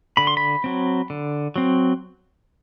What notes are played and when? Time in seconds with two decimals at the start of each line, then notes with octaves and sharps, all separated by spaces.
0.17 D3 B5
0.27 C6
0.37 B5
0.64 F#3 C4
1.10 D3
1.56 F#3 C4